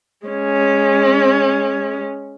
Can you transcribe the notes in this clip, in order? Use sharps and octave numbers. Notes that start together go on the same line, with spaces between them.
G#3 C#4